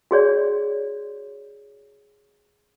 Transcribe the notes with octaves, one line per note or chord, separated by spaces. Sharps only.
F#4 G#4 C#5 D5